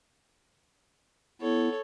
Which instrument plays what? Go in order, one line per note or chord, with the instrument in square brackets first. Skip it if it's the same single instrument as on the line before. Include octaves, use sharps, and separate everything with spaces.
[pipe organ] B3 E4 [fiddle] A4 C#5